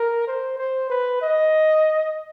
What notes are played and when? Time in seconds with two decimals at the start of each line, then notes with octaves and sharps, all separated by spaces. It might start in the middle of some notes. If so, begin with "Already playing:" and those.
Already playing: A#4
0.27 C5
0.58 C5
0.90 B4
1.21 D#5